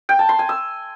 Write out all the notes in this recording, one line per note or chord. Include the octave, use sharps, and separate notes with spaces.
G5
A5
C6
G#5
E6